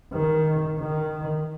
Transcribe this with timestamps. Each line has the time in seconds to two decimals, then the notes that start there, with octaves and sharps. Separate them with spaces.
0.13 D#3
0.79 D#3